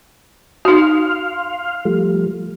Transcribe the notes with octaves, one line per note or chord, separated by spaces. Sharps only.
D#4 F#4 F5 C6 F6
F3 G3 A3